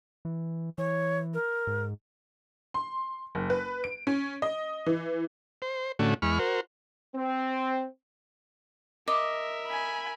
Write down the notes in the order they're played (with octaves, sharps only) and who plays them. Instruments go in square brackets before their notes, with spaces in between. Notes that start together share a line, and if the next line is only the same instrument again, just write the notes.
[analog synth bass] E3
[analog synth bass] E3 [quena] C#5
[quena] A#4
[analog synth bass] G#2
[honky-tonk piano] C6
F#1
B4
D7
C#4
D#5
E3
[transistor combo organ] C5
A2 D3 A3 C#4 F#4
E2 G#3 B5 C#6 F6
F#4 A#4 C5
[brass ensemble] C4
[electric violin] A#4 E5 [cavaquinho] D#5 [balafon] D6
[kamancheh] G#5 B5